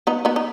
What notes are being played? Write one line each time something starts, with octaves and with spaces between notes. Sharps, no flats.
B3 D#4
B3 D#4
D#4